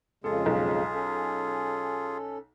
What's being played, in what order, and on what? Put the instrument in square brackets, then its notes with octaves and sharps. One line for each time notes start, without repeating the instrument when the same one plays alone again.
[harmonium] F2 C#3 G#3 [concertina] F4 G#4 [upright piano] A4
[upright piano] B1
[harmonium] C#4 A4